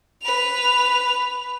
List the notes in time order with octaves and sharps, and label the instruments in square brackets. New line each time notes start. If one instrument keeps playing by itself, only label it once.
[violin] B4 F7